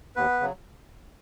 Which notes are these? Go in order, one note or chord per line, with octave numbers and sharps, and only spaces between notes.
D#2 B3 B4
C#3 F#3